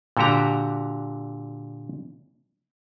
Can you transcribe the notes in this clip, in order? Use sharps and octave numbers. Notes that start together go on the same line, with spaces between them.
A#2 D3 F#4 G4 A#5